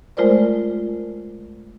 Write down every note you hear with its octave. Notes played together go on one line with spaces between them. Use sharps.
G#3 A3 F4 A#4 C5 D5